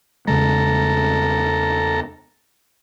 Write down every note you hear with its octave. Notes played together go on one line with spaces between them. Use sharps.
E2 C#3 G#3 A4 A#5